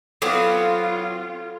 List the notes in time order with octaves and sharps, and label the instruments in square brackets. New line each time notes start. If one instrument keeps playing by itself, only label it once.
[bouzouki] F#3 B3 C4 [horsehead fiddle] F4 [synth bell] A4